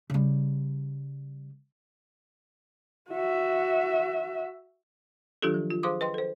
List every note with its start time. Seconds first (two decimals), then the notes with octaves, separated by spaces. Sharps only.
0.10 C#3 G3
3.10 F#4 E5
5.42 D#3 F#3 D4 F4 G4 A4
5.54 F3
5.70 F4
5.83 G#4 C5 F5 C6 D6 D#6
6.01 B4 D#5 G5 C6
6.14 A4 C5